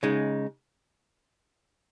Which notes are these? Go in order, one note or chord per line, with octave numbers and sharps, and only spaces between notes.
C#3 G#3 D#4